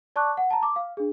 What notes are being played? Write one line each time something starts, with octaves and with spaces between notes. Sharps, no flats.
D5 A5 C#6 D6 F#6
F#5
A5 A#5
D6
F5
D4 G#4